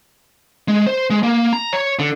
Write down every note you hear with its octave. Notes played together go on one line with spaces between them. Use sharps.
G#3
C5
G#3
A#3
A#5
C#5
D3